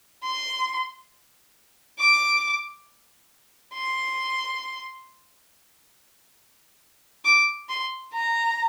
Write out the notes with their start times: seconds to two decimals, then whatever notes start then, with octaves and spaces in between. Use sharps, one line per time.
0.24 C6
1.99 D6
3.74 C6
7.25 D6
7.69 C6
8.14 A#5